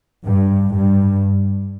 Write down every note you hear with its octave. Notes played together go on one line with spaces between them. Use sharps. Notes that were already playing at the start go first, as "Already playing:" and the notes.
G2
G2